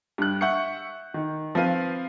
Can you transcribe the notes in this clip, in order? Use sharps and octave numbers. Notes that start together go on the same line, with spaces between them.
G2 F#6
E5 F#5 C#6 G6 C#7
D#3
F3 C4 B4 F5 D#7